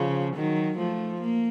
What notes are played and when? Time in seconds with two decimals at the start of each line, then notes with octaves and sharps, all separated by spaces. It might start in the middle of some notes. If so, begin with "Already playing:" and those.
Already playing: C#3 F3
0.36 D#3 F#3
0.78 F3 A3
1.21 A#3